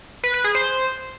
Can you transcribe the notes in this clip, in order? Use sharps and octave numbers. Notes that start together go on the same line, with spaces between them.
B4
B4
G#4
C5